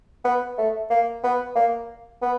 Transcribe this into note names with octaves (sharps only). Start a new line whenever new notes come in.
B3
A3
A#3
B3
A#3
B3